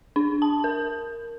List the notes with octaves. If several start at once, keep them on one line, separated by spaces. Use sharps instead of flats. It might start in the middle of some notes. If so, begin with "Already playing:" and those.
D4
A5
A#4